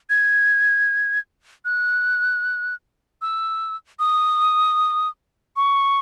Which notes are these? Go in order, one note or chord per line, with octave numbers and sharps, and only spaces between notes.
G#6
F#6
E6
D#6
C#6